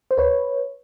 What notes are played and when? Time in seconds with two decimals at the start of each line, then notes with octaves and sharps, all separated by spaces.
0.11 C5
0.18 D2 B4 C#5